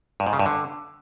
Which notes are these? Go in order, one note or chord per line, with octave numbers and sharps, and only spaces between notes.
G2
G#2
C#3
G2
D3